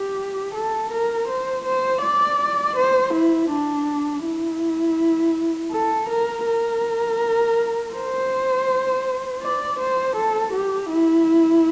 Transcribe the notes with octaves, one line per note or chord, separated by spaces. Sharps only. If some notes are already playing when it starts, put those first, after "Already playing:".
Already playing: G4
A4
A#4
C5
C5
D5
C5
E4
D4
E4
A4
A#4
A#4
C5
D5
C5
A4
G4
E4